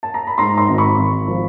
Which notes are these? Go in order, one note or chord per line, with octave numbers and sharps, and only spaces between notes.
A5
A#5
B5
G#2 A#5 C6
A#5 C6
G#1
B5 C#6
G#1
F3